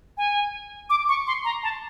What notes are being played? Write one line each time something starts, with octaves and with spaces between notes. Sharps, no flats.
G#5
D6
C#6
C6
A#5
A5